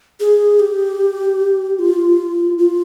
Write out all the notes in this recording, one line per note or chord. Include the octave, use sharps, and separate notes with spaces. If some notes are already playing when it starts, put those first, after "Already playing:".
G#4
G4
F4
F4